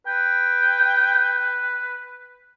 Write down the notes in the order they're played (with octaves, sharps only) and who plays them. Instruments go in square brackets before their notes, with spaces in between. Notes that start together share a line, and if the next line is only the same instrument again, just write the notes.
[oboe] B4 [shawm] G5